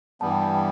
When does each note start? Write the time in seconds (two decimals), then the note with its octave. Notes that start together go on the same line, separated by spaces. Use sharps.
0.21 G2 E3 G3 B3 A5
0.32 G5
0.42 A5
0.53 G5